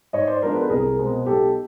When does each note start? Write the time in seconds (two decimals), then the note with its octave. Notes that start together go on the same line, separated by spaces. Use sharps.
0.13 G#2 C#5 D#5
0.27 C5 D5
0.42 F3 G#3 B3 D4 A#4 C5
0.56 A4 B4
0.70 C2 G#4 A#4
0.99 B2 G#3 C4
1.26 B1 G4 A4